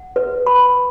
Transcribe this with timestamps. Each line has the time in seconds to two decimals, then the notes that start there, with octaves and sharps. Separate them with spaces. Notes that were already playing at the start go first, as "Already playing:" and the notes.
Already playing: F#5
0.16 B4
0.47 B5